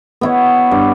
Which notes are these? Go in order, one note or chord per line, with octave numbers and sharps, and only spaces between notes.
B3 E4 C#5
G2